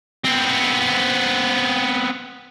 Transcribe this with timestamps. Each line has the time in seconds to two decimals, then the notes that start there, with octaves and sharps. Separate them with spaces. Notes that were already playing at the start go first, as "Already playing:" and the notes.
0.24 B3 C4